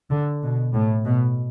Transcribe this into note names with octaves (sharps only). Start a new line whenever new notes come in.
D3
B2
A2
B2